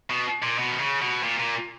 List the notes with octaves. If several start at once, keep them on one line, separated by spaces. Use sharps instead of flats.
B2
A#2
B2
D#3
C#3
B2
A#2
A#2